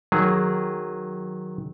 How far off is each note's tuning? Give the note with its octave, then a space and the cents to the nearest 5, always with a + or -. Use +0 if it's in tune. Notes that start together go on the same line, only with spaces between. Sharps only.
D#3 +0 F#3 +0 G#4 -10